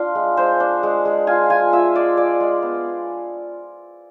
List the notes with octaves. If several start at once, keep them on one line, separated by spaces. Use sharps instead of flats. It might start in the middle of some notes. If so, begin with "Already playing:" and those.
Already playing: D4 F4
G#3
G#3 C5
D4
G#3
G#3
F4 G#5
F4 G#5
F4 E5
G#3 D5
F4 D5
G#3
B3